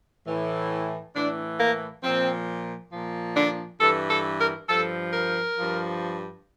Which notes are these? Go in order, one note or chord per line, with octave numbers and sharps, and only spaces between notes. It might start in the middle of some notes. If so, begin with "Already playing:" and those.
A2 E3
A2 E3 D4
A#3
A#2 F3 C4
A#2 F3
D4
G2 E3 A4
A4
A#4
G2 F3 A4
A#4
G2 F3